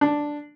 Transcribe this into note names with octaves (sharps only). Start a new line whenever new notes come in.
D4